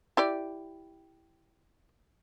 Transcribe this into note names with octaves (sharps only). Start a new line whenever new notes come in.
E4 G4 D5